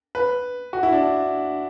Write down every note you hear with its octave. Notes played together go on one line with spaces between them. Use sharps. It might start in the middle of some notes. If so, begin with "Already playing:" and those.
B4
F#4
E4
D4